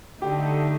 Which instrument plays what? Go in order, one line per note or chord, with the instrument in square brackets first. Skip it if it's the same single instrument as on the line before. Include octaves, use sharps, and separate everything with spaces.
[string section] D3 A3 D#4 [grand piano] G4